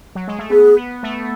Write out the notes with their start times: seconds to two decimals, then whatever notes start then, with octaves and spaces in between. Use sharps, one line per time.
0.15 F#3
0.28 G#3
0.39 A3
0.50 B3 G#4
0.77 B3
1.03 A3